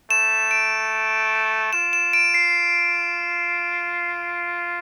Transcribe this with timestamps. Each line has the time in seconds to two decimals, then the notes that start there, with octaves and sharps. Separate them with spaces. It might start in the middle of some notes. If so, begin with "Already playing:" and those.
0.11 A3 E7
0.51 D7
1.73 F4 E7
1.93 E7
2.13 D7
2.34 C7